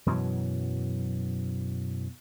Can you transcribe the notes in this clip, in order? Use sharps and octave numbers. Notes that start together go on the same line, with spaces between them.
F#2 B2 E3 F#3